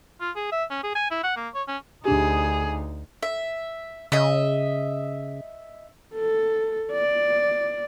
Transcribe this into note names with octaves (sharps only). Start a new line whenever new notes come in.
F4
G#4
E5
C#4
G#4
G#5
E4
F#5
A#3
C#5
C#4
D2 D4 D#4 G4 G#4
E5
C#3 D#5 E5
A4
D5